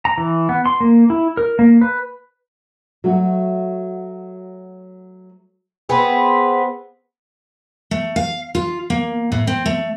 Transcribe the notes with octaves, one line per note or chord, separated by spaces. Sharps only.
A#5
E3
B3
C6
A#3
E4
A#4
A#3
B4
F#3 A3 F#4
B3 C4 G#4
A3
F5
F4
A#3
A2
C4
A3